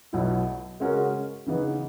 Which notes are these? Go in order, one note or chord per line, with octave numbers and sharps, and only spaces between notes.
B1 B2 F#3 B3 E4
C#3 G#3 C#4 F#4 A#4
C#3 E3 B3 D#4